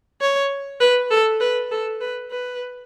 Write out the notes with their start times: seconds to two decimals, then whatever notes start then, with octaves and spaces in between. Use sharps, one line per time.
0.21 C#5
0.80 B4
1.11 A4
1.41 B4
1.71 A4
2.01 B4
2.31 B4